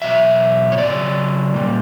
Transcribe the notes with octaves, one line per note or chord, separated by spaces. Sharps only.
B2 F#3 E5
C#5
C#3 F#3 D5
A#2 G3